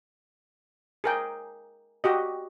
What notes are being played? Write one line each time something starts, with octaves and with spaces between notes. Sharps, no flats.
G#4 A#4 G5
F#4 G4 D#5